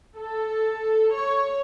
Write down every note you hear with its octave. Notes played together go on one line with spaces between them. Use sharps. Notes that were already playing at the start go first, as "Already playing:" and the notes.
A4
C#5